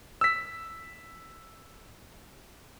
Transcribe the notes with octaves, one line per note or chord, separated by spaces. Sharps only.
E6 B6